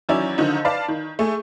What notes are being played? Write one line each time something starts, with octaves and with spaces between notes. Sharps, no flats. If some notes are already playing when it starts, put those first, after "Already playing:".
D#3 E3 F#3 C#4 E4 D5
D3 D#3 F3 D#4
B4 D5 F5 A5
D#3
A3 G#4